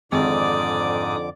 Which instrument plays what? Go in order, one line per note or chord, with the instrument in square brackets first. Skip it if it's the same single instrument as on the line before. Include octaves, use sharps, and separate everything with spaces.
[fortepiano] G#1 [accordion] F2 D3 D6 [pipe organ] G#2 D#6 [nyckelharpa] D5